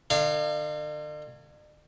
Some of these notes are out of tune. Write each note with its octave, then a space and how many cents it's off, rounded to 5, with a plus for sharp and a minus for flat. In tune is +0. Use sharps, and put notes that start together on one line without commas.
D3 +45 F5 -20